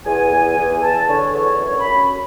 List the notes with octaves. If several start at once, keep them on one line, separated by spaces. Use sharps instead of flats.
E2 G#5
E2
E2
E2 A5
D3 C#5
E2 C#5
F#2 C#5
B5
F#2